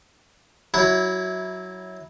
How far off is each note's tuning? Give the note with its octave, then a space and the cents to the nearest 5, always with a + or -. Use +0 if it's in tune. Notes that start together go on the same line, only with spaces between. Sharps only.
F#3 +0 E4 -20